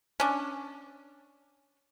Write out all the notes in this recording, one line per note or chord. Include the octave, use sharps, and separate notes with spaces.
C#4 D4